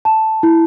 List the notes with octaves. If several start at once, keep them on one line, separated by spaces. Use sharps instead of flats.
A5
E4